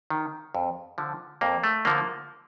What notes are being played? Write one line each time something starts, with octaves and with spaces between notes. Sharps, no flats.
D#3
F2
D3 F3
F2 A#3
A3
D3 F3 A#3